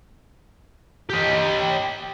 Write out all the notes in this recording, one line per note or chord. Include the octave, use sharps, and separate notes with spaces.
G4 D#5